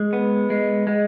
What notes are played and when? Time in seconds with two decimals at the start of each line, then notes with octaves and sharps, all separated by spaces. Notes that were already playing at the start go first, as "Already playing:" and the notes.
Already playing: G#3
0.13 B3
0.50 G#3
0.87 G#3